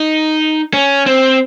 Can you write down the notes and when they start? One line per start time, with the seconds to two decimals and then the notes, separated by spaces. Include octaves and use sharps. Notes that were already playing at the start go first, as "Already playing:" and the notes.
Already playing: D#4
0.73 C#4
1.06 C4